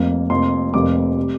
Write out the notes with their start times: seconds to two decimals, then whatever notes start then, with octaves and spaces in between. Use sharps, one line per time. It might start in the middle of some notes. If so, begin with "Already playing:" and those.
Already playing: F1 F2 C3 A#3
0.30 F1 F2 C3 A#3 C6
0.74 F1 F2 C3 G3 A#3 D6
1.17 C3 G3